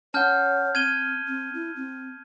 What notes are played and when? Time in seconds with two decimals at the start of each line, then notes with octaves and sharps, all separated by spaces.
0.14 C#4 C#5 F#5 A5 F6 G6
0.75 C4 F6 G#6 D#7 G7
1.27 C4
1.54 E4
1.76 C4